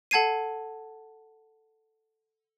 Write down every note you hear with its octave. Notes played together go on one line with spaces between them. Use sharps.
A4 F#5 A5 G#6 C7 D#7